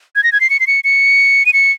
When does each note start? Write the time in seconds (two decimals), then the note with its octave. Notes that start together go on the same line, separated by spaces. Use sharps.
0.16 G#6
0.24 A#6
0.32 G#6
0.41 C7
0.50 C#7
0.60 C7
0.67 C#7
0.84 C#7
1.46 D#7
1.53 C#7